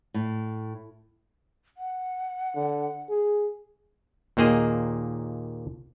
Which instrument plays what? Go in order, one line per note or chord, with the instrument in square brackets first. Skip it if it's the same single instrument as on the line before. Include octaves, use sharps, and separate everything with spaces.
[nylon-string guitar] A2
[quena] F#5
[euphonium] D3
G#4
[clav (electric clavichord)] D#2 A#2 A#3 G#4 D#5